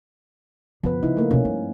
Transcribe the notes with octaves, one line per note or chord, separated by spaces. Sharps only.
F#2 D3 F3 B3 B4
C#3 D#4 E4
A3 A#3
B2 C#4 E4
G2